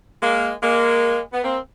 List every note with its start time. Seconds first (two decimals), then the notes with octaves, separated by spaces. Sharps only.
0.22 G#3 A#3
0.63 G#3 A#3
1.33 B3
1.44 A#3 C4